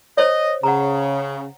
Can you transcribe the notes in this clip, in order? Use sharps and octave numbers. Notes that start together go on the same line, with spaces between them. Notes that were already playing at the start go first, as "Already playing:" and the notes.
C5 C#5 D#5
C#3 F#5 A#5